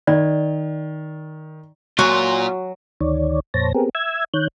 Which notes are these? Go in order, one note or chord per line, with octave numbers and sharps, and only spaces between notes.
D#3 D5
A#2 F#3 F4 F#4 G#5
D2 D#3 C#5 D5
F2 A#2 C5 C#5 A5 A#6
B3 C4 G4 G#4 A#4
E5 E6 G#6
D#3 C#5 F#6 G6